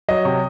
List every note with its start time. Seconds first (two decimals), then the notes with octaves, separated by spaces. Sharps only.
0.09 F#3 D#5
0.25 C3